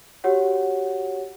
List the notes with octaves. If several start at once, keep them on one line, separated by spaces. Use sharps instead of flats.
F#4 G4 C#5 F#5